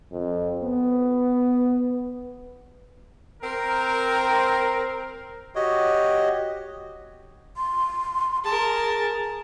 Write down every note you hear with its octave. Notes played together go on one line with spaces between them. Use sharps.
F2
B3
C4 A#4
F#4 G4 C#5 D#5
C6
G#4 A#4 A5